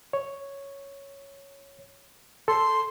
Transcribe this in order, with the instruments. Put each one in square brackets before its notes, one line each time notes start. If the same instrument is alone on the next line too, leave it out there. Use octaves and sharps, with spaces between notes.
[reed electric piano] C#5
[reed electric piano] A4 [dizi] C6